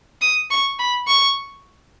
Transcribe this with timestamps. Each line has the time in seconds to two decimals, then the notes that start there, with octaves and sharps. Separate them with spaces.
0.21 D#6
0.51 C#6
0.79 B5
1.07 C#6